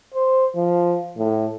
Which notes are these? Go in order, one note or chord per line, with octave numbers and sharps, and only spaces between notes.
C5
F3
A2